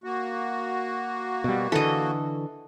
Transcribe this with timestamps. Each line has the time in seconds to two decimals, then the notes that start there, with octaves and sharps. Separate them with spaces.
0.04 A#3 F#4
1.44 B2 G3
1.72 D3 E3 A4 D#5